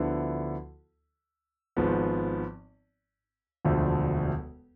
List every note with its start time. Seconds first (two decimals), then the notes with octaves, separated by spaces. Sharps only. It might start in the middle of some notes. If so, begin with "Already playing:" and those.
Already playing: D2 D3 F3 B3 E4
1.77 G#1 G#2 F3 B3
3.65 E1 D2 D3 F3 A3